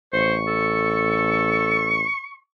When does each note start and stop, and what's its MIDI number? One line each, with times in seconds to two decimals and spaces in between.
0.13 2.04 33
0.13 0.35 72
0.13 2.38 85
0.47 2.01 69